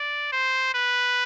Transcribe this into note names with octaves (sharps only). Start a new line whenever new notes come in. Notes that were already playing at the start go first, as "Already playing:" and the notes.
Already playing: D5
C5
B4